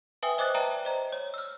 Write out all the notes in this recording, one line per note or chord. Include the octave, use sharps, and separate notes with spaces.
B4 E5 G5 G#5 D#6
C5 D#5 D6 D#6 F#6 A6
B4 D5 E5 G5 A5 A#5
C5 D#5 A#5
C#5
E6 F6